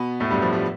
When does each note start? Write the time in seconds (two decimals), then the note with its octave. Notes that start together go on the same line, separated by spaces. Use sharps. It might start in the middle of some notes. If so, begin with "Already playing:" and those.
Already playing: B2 B3
0.20 A2 A3
0.31 G2 G3
0.42 F3
0.53 G3